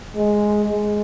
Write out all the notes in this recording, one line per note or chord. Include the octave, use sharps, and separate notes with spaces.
G#3
G#3